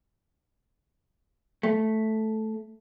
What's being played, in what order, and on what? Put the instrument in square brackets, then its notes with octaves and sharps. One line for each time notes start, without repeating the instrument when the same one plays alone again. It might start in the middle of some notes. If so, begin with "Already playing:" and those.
[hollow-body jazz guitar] A3